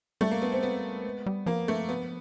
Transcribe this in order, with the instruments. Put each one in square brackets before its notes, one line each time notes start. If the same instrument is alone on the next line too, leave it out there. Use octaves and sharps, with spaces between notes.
[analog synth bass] G3 [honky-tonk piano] A3
[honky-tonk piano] A#3
B3
C4
B3
[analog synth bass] G#3
G3
[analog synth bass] F3 [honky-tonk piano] A#3
[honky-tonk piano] A3
B3